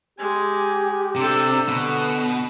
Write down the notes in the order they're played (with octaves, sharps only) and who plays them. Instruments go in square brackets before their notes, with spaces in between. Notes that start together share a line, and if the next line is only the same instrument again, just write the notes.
[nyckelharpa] G#3 G#5 [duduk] G4
[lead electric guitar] C3 [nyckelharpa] D4 A4
[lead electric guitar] B2 [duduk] D3 [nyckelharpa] F#5